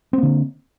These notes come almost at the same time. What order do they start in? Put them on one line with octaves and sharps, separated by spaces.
C4 A#3 D3